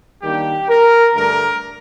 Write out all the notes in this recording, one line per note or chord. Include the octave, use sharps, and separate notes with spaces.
D#3 G3 A#3 D4 G4
A#4
G2 D3 A3 D4 A#4